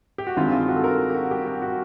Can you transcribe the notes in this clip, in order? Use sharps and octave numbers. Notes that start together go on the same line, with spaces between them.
G4
F#4
G2 D#3 G#3 C4 F4
F4
F#4
A4
A#4
G4
F#4
G4
F#4
F#4